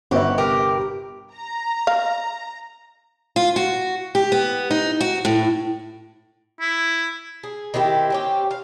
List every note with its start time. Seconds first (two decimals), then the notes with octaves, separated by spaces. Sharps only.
0.11 G1 F#4 G4 B4 C#5 E5
0.38 C3 G4 A#4
1.34 A#5
1.87 F5
3.36 F4
3.56 F#4
4.15 G4
4.32 B3
4.71 D#4
5.01 F#4
5.25 A2
6.61 E4
7.43 G#4
7.74 D#3 C4 E4 G4
8.10 C4 C#4 G4
8.51 F5